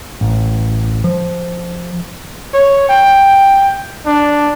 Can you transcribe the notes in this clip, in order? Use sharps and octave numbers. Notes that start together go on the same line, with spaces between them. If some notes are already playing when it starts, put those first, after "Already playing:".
A1
F3
C#5
G5
D4